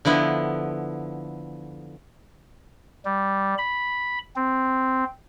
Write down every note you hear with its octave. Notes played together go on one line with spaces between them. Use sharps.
D3 F3 B3 E4
G3
B5
C4